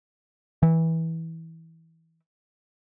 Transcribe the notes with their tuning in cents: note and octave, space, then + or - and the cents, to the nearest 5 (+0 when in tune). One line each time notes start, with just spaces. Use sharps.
E3 -20